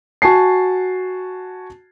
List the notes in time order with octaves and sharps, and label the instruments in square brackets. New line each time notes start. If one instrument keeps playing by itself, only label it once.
[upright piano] F#4 G#5 A5 C7